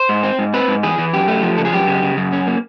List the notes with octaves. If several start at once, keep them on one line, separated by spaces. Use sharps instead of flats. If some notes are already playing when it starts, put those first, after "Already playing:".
Already playing: C5
G#2
C4
G#2
C4 B4
G#2
E3 G#4
E3
F#2 G4
A3
F3
C#3 A4
G#4
F#2 G4
C#3
C#3
F#2
C#4
A#3